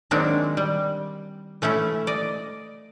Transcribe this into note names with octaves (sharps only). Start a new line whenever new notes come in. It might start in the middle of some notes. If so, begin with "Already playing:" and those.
D#3 F#3 G#3 A#3 C4 D4
G3
E3 A3 C#4 E4
D5 D#5